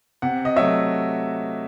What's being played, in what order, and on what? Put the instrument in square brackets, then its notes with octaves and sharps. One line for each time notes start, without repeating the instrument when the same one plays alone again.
[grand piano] C3 F#5
D#5
F#3 A3 E5